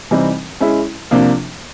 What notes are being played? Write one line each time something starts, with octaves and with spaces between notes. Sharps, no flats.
C3 E3 G3 C4 D#4
G#3 C#4 E4
C3 F3 A#3 D4